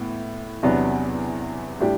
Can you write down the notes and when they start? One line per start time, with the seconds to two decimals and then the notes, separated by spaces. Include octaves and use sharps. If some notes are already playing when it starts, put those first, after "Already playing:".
Already playing: A2 E3 B3
0.63 E2 C3 F#3 B3 D4
1.80 A2 G3 D4 G4